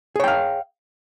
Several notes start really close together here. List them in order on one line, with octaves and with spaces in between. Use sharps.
G#4 C#5 G5 F5